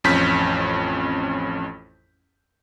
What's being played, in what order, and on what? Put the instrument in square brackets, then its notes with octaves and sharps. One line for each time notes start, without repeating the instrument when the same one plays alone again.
[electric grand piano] A1 F2 C#4 G6 B6